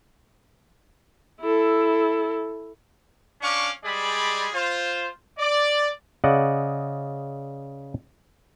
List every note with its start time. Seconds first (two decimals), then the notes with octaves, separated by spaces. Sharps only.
1.41 E4 A4
3.41 C#4 D4 F5 C#6 D6
3.83 G3 G#3 G#4 D5 B5
4.53 F4 C5
5.39 D5
6.24 C#3 D5 D#5 F#5